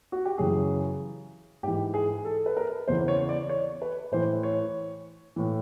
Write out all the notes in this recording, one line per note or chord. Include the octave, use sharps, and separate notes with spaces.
F#4
G4
F#2 C#3 E3 G#4
G#2 E3 G4
G#4
A4
B4
A#4
E2 C#3 E3 C5
C#5
D5
C#5
B4
A2 E3 C5
C#5
A2 E3